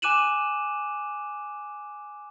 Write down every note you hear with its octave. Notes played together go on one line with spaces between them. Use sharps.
G#5 D6 F#6 D#7 E7 F#7